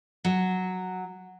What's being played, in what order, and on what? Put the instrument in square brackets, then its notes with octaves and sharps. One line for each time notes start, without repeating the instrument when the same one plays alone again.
[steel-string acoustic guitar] F#3